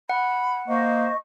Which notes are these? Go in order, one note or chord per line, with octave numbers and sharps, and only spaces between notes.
F#5 B5
A#3 C5 D#5 C#6